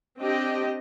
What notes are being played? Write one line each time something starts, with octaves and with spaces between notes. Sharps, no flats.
C4 D4 G4 D#5